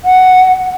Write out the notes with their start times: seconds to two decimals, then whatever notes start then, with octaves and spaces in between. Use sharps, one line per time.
0.05 F#5